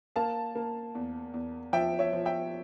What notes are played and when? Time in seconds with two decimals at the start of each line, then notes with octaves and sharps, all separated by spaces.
0.16 A#3 F5 A5
0.55 A#3
0.95 E2
1.34 E2
1.73 F3 E5 G5
1.99 C#5 E5
2.13 F3
2.26 E5 G5